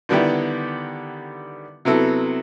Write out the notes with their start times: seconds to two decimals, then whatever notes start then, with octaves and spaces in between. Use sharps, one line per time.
0.09 D3 D#3 G3 B3 E4 G4
1.85 C3 F#3 B3 E4 A4